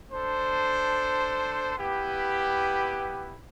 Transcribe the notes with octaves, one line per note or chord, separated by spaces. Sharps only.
D4 A4 C5
B3 E4 G4 B4